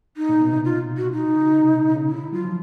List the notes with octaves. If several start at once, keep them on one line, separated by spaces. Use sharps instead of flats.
D#4
A#2
B2
C3
F4
F#4
D#4
C#3
C3
B2
C#3
C#3
D3 E4
F#3 F4
F3